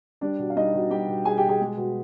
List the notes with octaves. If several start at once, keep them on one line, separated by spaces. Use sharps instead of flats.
G3 D4 D5
B2
F5
G3 D#4 D#5
B2
G3 G4 G5
B2
G3 G#4 G#5
G4 G5
B2
G#4 G#5
G#3
B2